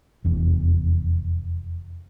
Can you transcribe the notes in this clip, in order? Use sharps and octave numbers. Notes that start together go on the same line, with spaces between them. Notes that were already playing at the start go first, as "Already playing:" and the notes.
F1 E2